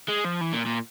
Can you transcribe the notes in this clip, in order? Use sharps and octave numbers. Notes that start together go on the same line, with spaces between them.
G#3
F3
E3
A#2
A#2